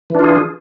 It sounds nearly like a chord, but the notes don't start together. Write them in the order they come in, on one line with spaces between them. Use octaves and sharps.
E3 D4 F4 G#4